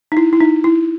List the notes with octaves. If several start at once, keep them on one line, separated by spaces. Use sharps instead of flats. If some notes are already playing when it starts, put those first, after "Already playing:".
D#4
E4
E4
D#4
E4